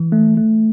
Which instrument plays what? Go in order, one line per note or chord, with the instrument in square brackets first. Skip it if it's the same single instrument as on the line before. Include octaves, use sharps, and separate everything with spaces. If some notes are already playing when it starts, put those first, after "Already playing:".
Already playing: [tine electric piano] E3
A3
A3